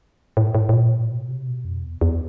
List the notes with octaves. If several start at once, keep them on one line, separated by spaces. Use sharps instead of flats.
A2
A2
A2
A#2
A2
B2
C3
B2
F2
E2
E2